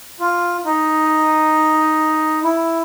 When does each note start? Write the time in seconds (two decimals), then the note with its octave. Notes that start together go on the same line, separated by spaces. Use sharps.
0.20 F4
0.65 D#4
2.44 E4